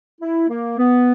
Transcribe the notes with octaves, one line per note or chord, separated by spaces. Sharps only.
E4
A#3
B3